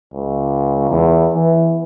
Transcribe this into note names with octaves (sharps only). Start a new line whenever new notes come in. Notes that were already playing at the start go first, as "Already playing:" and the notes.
C#2
E2
E3